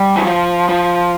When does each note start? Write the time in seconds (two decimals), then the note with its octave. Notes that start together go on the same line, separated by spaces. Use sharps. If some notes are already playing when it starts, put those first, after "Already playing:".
Already playing: G3
0.16 E3
0.24 F3
0.69 F3